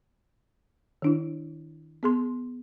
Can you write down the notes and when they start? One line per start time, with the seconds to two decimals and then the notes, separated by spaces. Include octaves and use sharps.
1.02 D#3 D4 E4
2.03 B3 G#4 C6